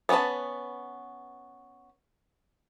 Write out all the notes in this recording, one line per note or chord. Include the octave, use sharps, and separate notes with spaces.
B3 C#4 A#4 B4 A5